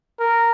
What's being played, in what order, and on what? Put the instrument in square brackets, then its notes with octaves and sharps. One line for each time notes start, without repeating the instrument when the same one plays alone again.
[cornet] A#4